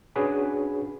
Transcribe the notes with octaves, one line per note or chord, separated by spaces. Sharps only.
C#4 D4 F#4 G#4 B4 C#5